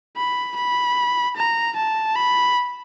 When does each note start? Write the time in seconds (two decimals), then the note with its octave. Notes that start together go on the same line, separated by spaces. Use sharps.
0.17 B5
0.57 B5
1.37 A#5
1.77 A5
2.16 B5